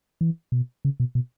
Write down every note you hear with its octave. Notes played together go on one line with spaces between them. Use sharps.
E3
B2
C#3
B2
B2